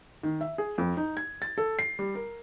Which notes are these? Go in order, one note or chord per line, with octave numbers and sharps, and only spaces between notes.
D#3
E5
G#4
F2
D#4
G#6
A6
A4
C7
G3
A#4